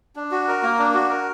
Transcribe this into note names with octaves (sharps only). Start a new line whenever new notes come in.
D4
F#4
A#4
A#3
D4
F#4
A#4